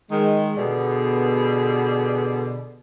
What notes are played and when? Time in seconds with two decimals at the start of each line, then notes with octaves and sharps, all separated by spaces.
0.10 D#3 G#3
0.57 B2 D3 B3 G4 G#4